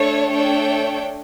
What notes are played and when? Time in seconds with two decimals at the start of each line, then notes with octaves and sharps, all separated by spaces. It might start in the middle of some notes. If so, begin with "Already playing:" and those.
Already playing: A3 D4 A4 C#5
0.30 A3 D4 A4 C#5 G5